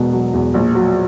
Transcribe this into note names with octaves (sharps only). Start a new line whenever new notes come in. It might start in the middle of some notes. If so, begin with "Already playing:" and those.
Already playing: E1 B2
F#3
E2
A#1
F#3